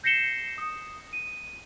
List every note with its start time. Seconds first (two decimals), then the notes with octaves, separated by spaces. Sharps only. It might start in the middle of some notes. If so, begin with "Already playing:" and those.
0.04 G6 A#6 C7 C#7 E7 G7
0.58 D#6
1.13 D#7